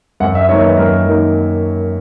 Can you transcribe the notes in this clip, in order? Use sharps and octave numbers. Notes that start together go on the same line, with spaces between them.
F#2 F#5
E5
D#3 F#3 A#3 D#4 C#5
B4
F#2 A#4
D#3 F#3 A#3 D#4